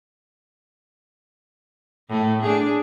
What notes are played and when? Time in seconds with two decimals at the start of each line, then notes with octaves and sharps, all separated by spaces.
2.09 A2 A3
2.42 D4 G#4